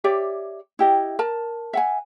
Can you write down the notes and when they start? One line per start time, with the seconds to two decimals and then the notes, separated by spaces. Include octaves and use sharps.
0.04 G4 C#5 D5 E5
0.79 E4 G4 D#5
1.19 A#4 A5
1.73 E5 F#5 G#5